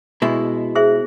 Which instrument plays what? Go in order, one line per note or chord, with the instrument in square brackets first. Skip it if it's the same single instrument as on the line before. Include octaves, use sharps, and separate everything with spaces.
[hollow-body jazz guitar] B2 G#3 E4
[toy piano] G#4 C5 E5